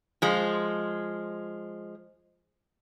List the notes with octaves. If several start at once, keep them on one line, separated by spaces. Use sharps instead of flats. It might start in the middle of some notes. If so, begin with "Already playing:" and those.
F3 G#3